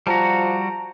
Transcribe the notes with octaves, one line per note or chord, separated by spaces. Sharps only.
F3 G3 F#4 A5 A#5